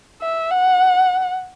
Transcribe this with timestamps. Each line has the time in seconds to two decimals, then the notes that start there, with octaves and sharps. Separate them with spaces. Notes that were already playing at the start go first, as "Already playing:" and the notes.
0.22 E5
0.51 F#5